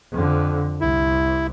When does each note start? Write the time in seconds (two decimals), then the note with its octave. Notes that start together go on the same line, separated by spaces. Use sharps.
0.12 F2 D3
0.81 C2 E4